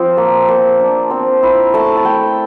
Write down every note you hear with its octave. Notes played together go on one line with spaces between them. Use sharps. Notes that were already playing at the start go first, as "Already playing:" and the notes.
Already playing: F3 C4 F4
A#3
A#3
D4
C4
E4
A3 A5
A5
A3 G5